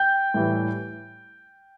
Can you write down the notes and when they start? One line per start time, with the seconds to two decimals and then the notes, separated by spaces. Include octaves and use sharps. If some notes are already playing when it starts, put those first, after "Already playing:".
Already playing: G5 G6
0.34 A2 E3 G3